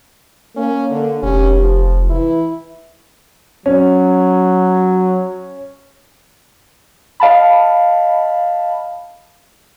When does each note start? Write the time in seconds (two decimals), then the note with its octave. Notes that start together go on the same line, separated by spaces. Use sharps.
0.56 A#3 C#4
0.90 D3
1.23 F1 C#4 G4
1.61 F3
2.09 E3 E4
3.66 F#3 C#4
7.20 D#5 F5 A5 B5